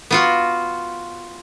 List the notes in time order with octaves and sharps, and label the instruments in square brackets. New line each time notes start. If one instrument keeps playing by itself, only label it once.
[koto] B3 F4 F#4